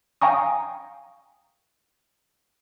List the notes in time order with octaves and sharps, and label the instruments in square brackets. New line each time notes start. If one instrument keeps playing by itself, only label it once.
[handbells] F5 G5 G#5 A#5 C#6 D#6